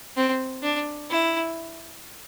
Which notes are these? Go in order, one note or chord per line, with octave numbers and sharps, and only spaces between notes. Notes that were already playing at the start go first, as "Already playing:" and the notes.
C4
D4
E4